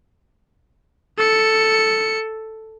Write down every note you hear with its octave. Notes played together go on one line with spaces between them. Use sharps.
A4 C#7